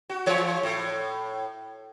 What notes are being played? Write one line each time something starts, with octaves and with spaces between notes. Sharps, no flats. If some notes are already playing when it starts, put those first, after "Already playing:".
F#4
E3 G#3 C#5
A2